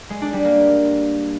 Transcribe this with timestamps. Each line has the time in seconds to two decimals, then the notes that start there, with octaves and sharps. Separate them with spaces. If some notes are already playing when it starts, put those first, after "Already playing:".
0.10 G#3
0.22 D4
0.33 G3
0.45 A#3